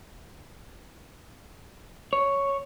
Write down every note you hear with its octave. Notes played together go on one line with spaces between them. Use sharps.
C#5